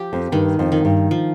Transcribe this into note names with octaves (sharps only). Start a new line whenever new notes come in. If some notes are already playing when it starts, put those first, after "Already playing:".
Already playing: F3 G4
F2
G2 D#3
F2
D#3
G2
F3